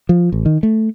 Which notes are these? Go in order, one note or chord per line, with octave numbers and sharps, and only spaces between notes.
F3
A1
D#3
A3